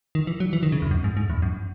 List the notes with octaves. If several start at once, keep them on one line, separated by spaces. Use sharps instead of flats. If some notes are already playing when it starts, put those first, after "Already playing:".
D#3
E3
F#3
E3
D#3
C#3
E2
F#2
G#2
G#2
E2
F#2